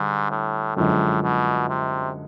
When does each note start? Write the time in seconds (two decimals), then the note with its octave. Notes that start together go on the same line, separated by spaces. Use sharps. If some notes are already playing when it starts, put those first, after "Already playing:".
Already playing: G#2 D3 G3
0.31 A2
0.76 F#2 A2 D3 F3 G#3
1.23 B2
1.69 C3